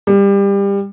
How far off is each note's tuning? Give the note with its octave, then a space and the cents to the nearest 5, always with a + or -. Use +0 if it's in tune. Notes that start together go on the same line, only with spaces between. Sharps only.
G3 +25